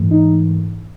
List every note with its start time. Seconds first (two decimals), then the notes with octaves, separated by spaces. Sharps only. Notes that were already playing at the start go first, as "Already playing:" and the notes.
Already playing: G#2 E3 A3
0.11 D#4